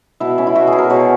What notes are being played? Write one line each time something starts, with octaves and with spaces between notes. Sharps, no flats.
B2 E4
C#4
E4
B2 F#4
G#4
B2
A#4
B2 C#5